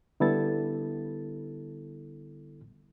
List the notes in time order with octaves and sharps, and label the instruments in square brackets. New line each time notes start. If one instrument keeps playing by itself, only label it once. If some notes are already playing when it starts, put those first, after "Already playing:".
[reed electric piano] D3 G3 B3 E4 A4 A6